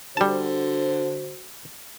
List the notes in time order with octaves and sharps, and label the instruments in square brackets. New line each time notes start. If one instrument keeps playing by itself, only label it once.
[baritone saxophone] D3 [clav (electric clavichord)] G3 A5 [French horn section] F#4 C5